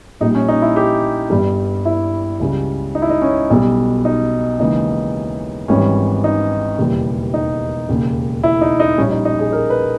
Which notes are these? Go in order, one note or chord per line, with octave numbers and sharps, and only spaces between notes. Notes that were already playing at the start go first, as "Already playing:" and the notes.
A#1 A#2 G3 D#4
C#4
D#4
E4
G4
G1 G2 G3
E4
C#2 C#3 G3
D#4
E4
D#4
C#4
B1 B2 G3
D#4
D#2 C#3 E3 G#3 D#4
G#1 G#2 E3 G3 C#4
D#4
E1 D#2 C#3 E3 G3
D#4
E1 D#2 C#3
E4
D#4
D#4
A#1 A#2 G3 C#4
D#4
D#4
G#4
A#4
B4